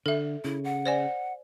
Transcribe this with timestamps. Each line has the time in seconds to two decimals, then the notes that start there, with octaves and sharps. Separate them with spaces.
0.06 D3 A4 E5
0.44 C#3 E4
0.64 F#5
0.86 C5 D5 G#5